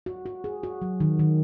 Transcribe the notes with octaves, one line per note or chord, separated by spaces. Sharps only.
F#4
F#4
G#4
F#4
F#3
D#3
D#3